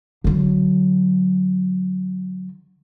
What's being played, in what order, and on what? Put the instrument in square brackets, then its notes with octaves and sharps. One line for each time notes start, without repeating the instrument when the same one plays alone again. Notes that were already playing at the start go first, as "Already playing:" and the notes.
[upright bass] D3 F#3